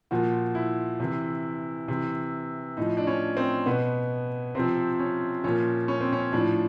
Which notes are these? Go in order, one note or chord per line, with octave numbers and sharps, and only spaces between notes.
A#2 F3 F#4
E4
C3 E3
C3 E3
A2 F3 D#4
D4
C#4
C4
B2 B3
C3 F3 C4
C#4
A#2 F3 C#4
C#4
C4
C#4
A2 F3 D4